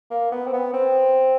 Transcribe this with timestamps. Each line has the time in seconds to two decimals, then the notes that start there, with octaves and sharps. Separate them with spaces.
0.11 A#3
0.32 B3
0.47 C4
0.53 B3
0.74 C4